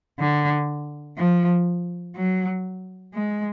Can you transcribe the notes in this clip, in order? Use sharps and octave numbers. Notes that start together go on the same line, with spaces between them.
D3
F3
F#3
G#3